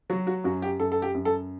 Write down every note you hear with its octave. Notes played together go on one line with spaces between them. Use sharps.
F#3 F#4
F#4
F#2 F#4
G4
F#2 A4
A4
G4
F#2
A4